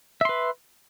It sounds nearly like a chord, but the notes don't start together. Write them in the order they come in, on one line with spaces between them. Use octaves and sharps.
E5 C6 B4